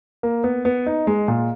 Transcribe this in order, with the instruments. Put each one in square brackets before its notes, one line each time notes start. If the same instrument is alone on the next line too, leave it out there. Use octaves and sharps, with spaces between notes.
[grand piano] A#3
B3
B3
D#4
G#3
A#2